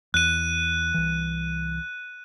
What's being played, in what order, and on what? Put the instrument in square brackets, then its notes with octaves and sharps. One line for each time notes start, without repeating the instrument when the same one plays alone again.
[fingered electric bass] E2 [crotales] F#6 D#7
[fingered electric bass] C2 E3